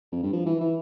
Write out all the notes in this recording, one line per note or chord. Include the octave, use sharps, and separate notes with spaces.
F2
G2
F3
E3
E3